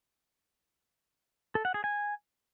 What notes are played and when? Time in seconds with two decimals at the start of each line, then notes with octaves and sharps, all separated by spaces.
1.55 A4
1.65 F#5
1.74 G#4
1.84 G#5